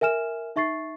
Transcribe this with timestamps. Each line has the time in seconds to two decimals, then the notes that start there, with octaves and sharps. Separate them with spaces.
0.01 A#4 E5 G#5 F6 E7
0.56 D#4 E5 C#6 A6 C7